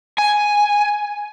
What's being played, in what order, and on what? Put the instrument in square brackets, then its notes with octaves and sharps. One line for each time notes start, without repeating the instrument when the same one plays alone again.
[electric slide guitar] G#5